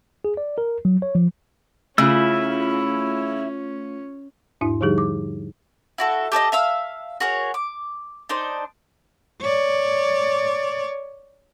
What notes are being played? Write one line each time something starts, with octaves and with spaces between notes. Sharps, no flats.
G#4
D5
A#4
F#3
C#5
F3
C#3 A3 C#4 E4 F4 E6
E2 G#2 D4 E4
D3 F3 G3 D#4 G4 G#4
D6
E4 F#4 A4
G4 A4 C#5 D#5
E5 F5 E6
F#4 G#4 A#4 C#5
D6
D4 D#4 C5
C#5 D5